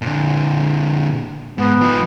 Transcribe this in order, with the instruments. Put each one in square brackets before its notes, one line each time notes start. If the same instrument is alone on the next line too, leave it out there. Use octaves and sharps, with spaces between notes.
[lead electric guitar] A#2 D3
[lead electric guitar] G#2 [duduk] B3
[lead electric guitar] F3 D#4